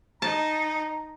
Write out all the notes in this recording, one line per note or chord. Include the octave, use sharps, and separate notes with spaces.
D#4 A5 A#5